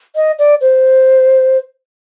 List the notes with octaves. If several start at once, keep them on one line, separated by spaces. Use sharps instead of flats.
D#5
D5
C5